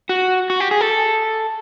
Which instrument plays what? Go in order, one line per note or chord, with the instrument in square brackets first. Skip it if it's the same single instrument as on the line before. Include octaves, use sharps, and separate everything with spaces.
[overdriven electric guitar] F#4
F#4
G4
G#4
A4